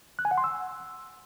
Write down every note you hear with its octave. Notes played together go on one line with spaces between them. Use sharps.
F#6
G#5
F#5
C6
E6